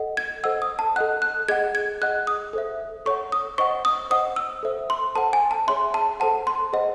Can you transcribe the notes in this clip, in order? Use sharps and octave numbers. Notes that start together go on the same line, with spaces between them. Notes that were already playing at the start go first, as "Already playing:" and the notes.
Already playing: A4 D#5 F#5
G#6
A4 C5 D#5 F#5 E6
D#6
A5
A4 D#5 F#5 F#6
F#6
G#4 D#5 F#5 G#6
G#6
G#4 D#5 F#5 F#6
D#6
A4 C5 E5
A4 C#5 F#5 C#6
D#6
C5 D#5 F#5 C#6
D#6
C5 D#5 F#5 D#6
E6
A4 C5 E5
C6
A4 C5 F#5 A5
G#5
A5
G#4 C#5 E5 C6
A5
A4 C5 F#5 A5
C6
G#4 C5 D#5 F#5